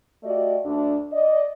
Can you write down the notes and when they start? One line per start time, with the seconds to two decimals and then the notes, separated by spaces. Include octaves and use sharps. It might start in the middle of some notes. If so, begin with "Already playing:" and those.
0.23 A3 F#4 G4 D5 D#5
0.64 D2 D4
1.12 D5 D#5